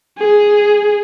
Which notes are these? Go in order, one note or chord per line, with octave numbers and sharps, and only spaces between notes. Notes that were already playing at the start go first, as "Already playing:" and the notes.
G#4